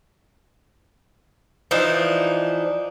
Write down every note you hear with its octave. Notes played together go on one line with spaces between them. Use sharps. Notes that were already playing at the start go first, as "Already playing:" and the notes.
E3 F3 D4 D#4